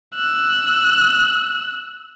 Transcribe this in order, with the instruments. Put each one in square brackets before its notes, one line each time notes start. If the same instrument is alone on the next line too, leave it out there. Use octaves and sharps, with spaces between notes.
[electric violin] E6 F#6